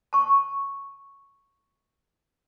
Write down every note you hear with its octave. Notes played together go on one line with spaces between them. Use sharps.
A5 C#6